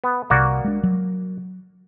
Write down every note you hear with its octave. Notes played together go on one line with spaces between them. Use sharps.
B3
C2 C3 A#3 F#4 D5
G#3 D4
F#3